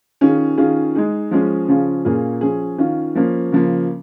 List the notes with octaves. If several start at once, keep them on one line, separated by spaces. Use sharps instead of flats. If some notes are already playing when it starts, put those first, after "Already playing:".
D#3 C#4 F4 G#4
D#3 C#4 F4 G#4
G#3 D#4 G#4
F3 G#3 C#4 G#4
C#3 F3 C#4 F4 G#4
A#2 A#3 C#4 F4 G#4
F3 C#4 G#4
D#3 C#4 F4
F3 A#3 C#4
C#3 F3 A#3